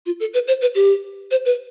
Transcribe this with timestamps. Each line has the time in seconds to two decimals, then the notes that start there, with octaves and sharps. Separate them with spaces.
0.05 F4
0.20 A4
0.33 B4
0.47 C5
0.61 B4
0.74 G4
1.31 C5
1.45 B4